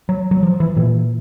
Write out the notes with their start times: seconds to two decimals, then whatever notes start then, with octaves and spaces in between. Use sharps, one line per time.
0.09 F#3
0.31 F#3
0.43 F3
0.60 E3
0.76 A#2 E3